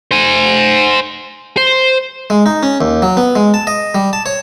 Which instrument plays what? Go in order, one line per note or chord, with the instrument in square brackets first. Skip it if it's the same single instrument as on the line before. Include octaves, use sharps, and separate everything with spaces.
[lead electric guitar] C5 G#5
C5
[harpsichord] G#3
D#4
C#4
D#2
F#3
B3
G#3
A5
D#5
G3
A5
C#5